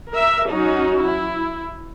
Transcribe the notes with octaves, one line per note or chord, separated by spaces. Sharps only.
A#4 E5
F#3 C#4 D#4 F#4
E4